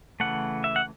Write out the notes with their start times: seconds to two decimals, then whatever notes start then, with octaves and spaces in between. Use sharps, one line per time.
0.20 C#3 E3 A3 F#5
0.64 E5
0.76 F#5